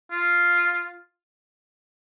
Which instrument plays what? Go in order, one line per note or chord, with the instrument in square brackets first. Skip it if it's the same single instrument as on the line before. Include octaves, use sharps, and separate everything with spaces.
[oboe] F4